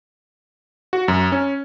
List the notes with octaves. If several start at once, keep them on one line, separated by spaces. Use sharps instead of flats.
F#4
F#2
C#4